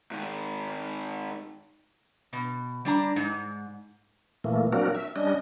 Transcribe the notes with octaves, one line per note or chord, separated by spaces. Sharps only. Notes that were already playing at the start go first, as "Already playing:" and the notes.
G#2 D#3
B2
G3 D4 A#5
G#2
A#2 E3 A3 A#3
F#3 A#3 C4 D4 F#4 A#4
E5
G3 C#4 D4 D#5